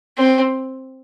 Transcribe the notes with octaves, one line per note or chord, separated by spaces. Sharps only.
C4